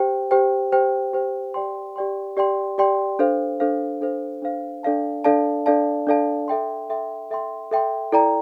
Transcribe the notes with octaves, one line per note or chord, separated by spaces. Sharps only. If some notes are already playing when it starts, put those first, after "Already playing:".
Already playing: G4 C5 G5
G4 C5 G5
G4 C5 G5
G4 C5 G5
G4 D5 G5 C6
G4 D5 G5 C6
G4 D5 G5 C6
G4 D5 G5 C6
D4 A4 C5 F5
D4 A4 C5 F5
D4 A4 C5 F5
D4 A4 C5 F5
D4 A4 D5 F5 A5
D4 A4 D5 F5 A5
D4 A4 D5 F5 A5
D4 A4 D5 F5 A5
A4 E5 G5 C6
A4 E5 G5 C6
A4 E5 G5 C6
A4 E5 G5 C6
E4 A4 D5 G5 A#5